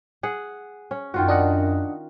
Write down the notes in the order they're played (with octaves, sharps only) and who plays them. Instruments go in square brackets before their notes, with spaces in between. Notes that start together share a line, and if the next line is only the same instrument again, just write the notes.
[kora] G#4 F#5
C#4
[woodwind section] F#2 [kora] D#3 F4 F#4
[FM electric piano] D4 D#5 F#5